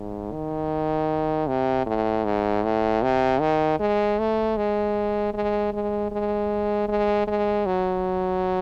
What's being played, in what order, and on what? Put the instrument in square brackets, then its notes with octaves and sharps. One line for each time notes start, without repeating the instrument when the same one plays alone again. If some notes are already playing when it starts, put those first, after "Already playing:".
Already playing: [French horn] G#2
D#3
C3
A2
G#2
A2
C3
D#3
G#3
A3
G#3
G#3
G#3
G#3
G#3
G#3
F#3